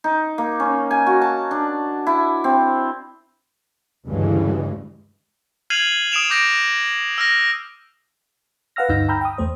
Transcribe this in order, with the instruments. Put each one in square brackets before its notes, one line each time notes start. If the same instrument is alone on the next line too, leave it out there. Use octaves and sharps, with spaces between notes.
[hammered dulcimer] D#4
A#3
C#4
G#5
F#4
A5
D4
E4
C4
[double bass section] D2 G2 G#3 [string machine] C#3 E3
[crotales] F6 G#6 C7 D#7 F7 F#7
D#6 C7 D7 E7 F7
D6 G6 A#6 D7 F7
E6 F6 A#6
[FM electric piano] B4 F5 F#5 E6 F6 A#6
D2 G2 D#4 E6 G6 A#6
G5 A#5 B5 E6 F6 G6
G5 D#6
E2 A3 C5 D#6